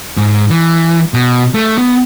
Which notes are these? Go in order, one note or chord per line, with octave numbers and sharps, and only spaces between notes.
G#2
E3
B2
A3
B3